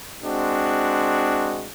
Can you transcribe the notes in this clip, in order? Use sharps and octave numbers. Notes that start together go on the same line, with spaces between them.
G#3 C4 D4 F#4